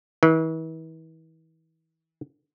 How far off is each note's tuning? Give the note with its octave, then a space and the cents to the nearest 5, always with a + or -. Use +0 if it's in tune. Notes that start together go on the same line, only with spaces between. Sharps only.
E3 -40